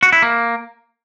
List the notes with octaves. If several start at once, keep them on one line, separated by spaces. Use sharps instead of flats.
F#4
E4
A#3